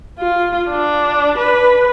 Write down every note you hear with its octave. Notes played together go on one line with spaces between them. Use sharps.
F4
D4
B4